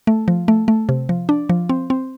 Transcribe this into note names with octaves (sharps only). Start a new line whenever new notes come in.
A3
F3
A3
A3
C3
F3
D4
F3
C4
C4